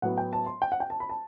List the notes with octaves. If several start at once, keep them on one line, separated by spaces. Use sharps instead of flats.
A2 F#3 B3 F#5
G5
A5
C6
G5
F#5
G5
A5
B5
A5